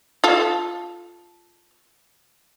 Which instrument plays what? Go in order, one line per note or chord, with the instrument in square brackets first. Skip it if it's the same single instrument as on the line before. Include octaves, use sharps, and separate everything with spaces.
[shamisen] F4 A4